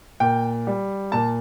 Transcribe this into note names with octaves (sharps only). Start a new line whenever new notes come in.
A#2 G5
G3
A#2 A5